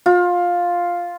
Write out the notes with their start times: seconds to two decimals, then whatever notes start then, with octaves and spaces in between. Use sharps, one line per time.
0.06 F4